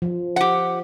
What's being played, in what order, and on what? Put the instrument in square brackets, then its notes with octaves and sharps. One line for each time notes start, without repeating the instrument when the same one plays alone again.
[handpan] F3
[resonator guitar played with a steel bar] G4 F#5